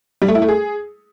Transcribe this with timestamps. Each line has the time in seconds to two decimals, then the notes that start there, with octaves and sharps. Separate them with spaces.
0.22 G3
0.28 A3
0.35 E4
0.42 A3
0.49 G#4